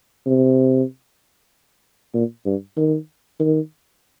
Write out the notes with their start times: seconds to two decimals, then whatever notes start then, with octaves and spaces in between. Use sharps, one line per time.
0.26 C3
2.14 A#2
2.46 G2
2.77 D#3
3.40 D#3